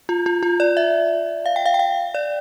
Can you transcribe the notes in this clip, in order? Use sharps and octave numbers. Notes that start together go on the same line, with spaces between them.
F4
F4
F4
D5
E5
F5
G5
F5
G5
F5
D5